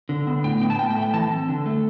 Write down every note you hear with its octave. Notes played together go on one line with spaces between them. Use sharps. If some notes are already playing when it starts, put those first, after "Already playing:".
D3
B3
A2 G5
B3 G5
A5
A2 G5
G5
A3
G5
E3 A5
C4
D3
A3